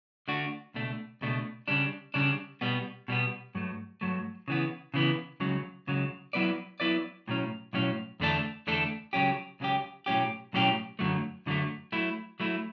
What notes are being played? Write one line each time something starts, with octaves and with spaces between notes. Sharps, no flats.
D3 A3 D4 F#4
C#2 B2 A3 D4
C#2 B2 A3 D4
C#3 G3 D4
C#3 G3 D4
B2 G3 B3
B2 G3 B3
G2 F#3 A3
G2 F#3 A3
C#3 E3 B3
C#3 E3 B3
C#2 C#3 F#3
C#2 C#3 F#3
F#3 B3 E4 B4 D5
F#3 B3 E4 B4 D5
B1 A2 F#3 C#4
B1 A2 F#3 C#4
E2 D3 A3 D4 A4
E2 D3 A3 D4 A4
C#2 C#3 F#3 C#4 G4
C#2 C#3 F#3 C#4 G4
B1 A2 F#3 C#4 G4
B1 A2 F#3 C#4 G4
F#2 D3 F#3 A3
F#2 D3 F#3 A3
F#3 A3 E4
F#3 A3 E4